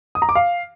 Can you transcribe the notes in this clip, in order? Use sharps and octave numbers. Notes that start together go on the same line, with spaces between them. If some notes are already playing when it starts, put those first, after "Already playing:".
D#6
A#5
D6
F5